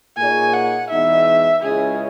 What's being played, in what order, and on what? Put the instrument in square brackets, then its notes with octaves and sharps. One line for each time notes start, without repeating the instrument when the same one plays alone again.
[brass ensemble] A#2 A#3 D#4 G#4 C#5 [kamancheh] G#5
[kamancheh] F#5
[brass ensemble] E2 B2 G#3 D#4 [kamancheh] E5
[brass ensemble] C#2 C#3 G#3 C#4 E4 [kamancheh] G#4